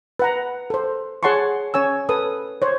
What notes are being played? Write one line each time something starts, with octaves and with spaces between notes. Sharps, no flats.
B4 F#5 A#5
A4 C5
G#4 C#5 F#5 A5 C6 C#6
C#4 C#5 G#5 E6
A4 B4 D#6
C5 C#5